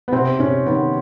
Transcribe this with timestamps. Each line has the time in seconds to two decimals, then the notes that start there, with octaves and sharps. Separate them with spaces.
0.08 B3
0.12 C3 C4
0.39 C3 C#4
0.66 D#3 B3